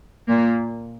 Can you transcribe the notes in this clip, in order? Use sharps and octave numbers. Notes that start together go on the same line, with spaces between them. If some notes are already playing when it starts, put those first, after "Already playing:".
A#2 A#3